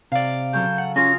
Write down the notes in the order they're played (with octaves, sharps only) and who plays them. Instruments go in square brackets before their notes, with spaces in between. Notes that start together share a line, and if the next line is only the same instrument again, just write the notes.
[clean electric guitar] C3 D5 [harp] F5
[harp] C#3 F#3 A4 [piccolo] G6
[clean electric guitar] F#5
[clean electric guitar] C#4 [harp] F4 G#4 [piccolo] A#6